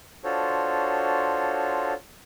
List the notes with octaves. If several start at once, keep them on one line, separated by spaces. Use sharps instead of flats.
D4 F4 F#4 A4 C5 C#5